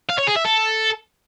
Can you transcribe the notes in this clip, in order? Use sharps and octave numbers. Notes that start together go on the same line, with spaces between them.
F5
C#5
G#4
E5
A4